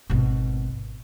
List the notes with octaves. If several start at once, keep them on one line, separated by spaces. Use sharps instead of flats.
G#1 B2